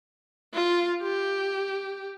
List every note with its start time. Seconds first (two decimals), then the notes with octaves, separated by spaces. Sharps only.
0.54 F4
1.03 G4